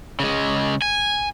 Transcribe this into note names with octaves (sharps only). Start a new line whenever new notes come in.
C#3 G#3
G#5